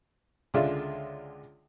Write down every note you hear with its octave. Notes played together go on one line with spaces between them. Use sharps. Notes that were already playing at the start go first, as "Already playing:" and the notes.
C#2 D3 G#3 F4 D5 E5